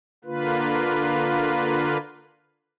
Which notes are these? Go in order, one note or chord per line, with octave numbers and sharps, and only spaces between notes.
D3 A#3 F4 B4